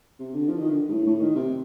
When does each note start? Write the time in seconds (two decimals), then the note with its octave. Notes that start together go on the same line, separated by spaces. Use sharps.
0.19 C3
0.34 D3
0.49 F3
0.59 D#3
0.70 D3
0.89 G2
0.92 A2
1.07 A2
1.21 D#3
1.36 C3